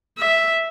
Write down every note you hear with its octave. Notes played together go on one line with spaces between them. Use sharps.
E5